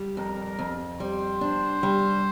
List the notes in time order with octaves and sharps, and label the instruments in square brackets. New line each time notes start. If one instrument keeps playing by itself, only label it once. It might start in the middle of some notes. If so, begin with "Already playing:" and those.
Already playing: [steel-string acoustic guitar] G3
[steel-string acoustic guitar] F2 [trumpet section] A#4
[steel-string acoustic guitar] F2
[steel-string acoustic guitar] G3 [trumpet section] C5
[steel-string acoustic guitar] D4
G3